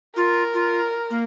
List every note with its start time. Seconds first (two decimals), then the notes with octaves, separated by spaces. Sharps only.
0.16 F4 A#4
0.54 F4
1.10 A#3